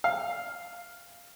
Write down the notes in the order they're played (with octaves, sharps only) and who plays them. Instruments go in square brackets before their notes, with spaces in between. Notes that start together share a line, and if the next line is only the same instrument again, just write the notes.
[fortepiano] F5